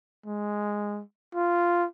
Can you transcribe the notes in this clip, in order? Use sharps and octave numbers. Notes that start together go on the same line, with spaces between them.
G#3
F4